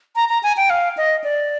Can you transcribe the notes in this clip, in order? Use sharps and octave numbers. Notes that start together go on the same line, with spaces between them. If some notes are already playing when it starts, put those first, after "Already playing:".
A#5
A#5
G#5
G5
F5
D#5
D5